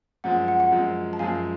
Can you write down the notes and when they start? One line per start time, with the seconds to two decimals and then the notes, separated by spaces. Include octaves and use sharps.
0.24 F#2 F3 G#3 F#5
0.48 F#5
0.60 F#5
0.72 F#2 F3 G#3
1.13 A5
1.19 F#2 F3 G#3 F5 G#5